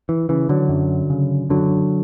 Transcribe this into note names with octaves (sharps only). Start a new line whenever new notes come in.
E3
C#3 E3
D3 F#3
F#2
C#3
F#2 D3 F#3